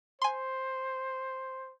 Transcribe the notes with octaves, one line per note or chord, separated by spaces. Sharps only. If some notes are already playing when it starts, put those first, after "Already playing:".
C5 G#5 C6